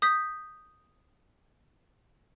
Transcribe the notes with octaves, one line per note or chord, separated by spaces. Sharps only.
D#6 G6 B6